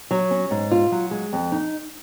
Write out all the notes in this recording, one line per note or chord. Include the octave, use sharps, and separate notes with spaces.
F#3
C#4
G#2
F4
F#3
G#3
F2
D#4